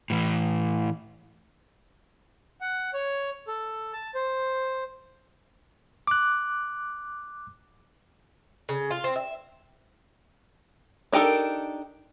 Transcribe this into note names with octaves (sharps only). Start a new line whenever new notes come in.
A2 E3
F#5
C#5
A4
A5
C5
D6 F#6
C#3
F4
C4
E5
D4 D#4 G4 A4 A#4